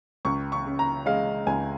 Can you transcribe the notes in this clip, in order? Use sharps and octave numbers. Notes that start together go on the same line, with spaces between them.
C#2 C#6
C#6
C#3
A#5
G#3 F5
C#2 G#5